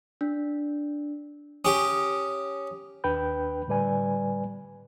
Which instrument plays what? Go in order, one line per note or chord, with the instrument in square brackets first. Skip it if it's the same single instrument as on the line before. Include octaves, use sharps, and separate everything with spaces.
[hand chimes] D4
[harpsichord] C#4 G4 [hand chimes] D#6
[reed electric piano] D#2 D4 B4 G5 B5 G6
A2 D3 G3 B4 D5 G#5